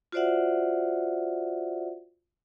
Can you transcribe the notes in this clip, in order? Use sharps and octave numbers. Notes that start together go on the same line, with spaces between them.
F4 F#4 C5 D5 E5 F#5